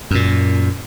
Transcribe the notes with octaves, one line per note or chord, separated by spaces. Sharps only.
F#2 A#2